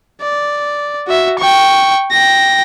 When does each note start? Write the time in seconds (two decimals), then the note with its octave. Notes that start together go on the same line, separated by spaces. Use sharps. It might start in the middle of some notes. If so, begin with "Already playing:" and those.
0.22 D5
1.07 F#4 E5
1.39 G5 C#6
2.11 G5 A#6